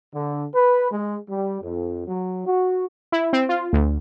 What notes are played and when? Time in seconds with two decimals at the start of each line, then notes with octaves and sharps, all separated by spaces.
0.15 D3
0.54 B4
0.92 G#3
1.29 G3
1.62 F2
2.07 F#3
2.46 F#4
3.12 E4
3.33 C4
3.49 F4
3.73 D2